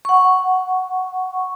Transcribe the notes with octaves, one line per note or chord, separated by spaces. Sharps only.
F#5 C#6